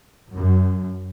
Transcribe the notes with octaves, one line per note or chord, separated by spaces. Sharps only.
F#2